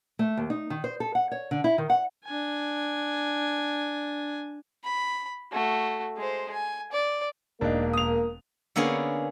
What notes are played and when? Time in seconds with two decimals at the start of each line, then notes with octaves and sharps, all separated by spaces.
0.19 A3
0.37 D#2
0.50 D#4
0.70 D#3
0.84 C5
1.00 A4
1.15 F#5
1.32 C#5
1.51 D3
1.64 E4
1.78 D#3
1.90 F#5
2.25 D4 G#5
4.84 B5
5.52 A3 F#4
6.17 G#3 C5
6.53 G#5
6.92 D5
7.61 E1 A#3 D4 D#4 A#4
7.93 D#6 F7
8.76 D3 A#3 B3 C#4 G#4